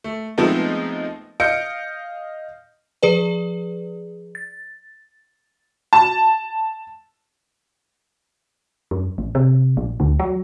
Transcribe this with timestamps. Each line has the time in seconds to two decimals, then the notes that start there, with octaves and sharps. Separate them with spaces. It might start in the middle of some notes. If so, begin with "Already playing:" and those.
0.04 A3
0.38 F3 G#3 A3 B3 C4 D#4
1.40 D#5 F5 G6 C#7 D7
3.03 F3 G#4 B4 D5
4.35 A6
5.93 A5
8.91 F#2
9.18 A1
9.35 C3
9.77 A#1
10.00 D2
10.20 F#3